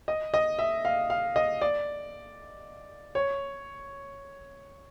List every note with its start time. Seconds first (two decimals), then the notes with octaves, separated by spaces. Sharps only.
0.08 D#5
0.34 D#5
0.59 E5
0.85 F5
1.10 F5
1.36 D#5
1.61 D5
3.15 C#5